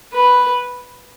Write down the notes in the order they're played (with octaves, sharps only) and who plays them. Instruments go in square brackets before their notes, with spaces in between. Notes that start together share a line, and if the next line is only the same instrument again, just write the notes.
[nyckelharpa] B4